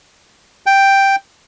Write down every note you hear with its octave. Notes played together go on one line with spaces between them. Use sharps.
G5